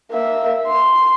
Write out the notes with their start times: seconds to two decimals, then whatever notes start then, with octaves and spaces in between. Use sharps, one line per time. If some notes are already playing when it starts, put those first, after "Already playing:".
0.11 A#3 E5
0.67 C6